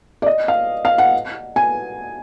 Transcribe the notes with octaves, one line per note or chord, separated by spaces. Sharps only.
D5
D#5
F5
F5
F#5
G#5